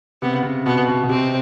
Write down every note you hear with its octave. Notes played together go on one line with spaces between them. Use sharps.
C3 B3
C#3
C3
B2 B3
B2
B2
C3 C4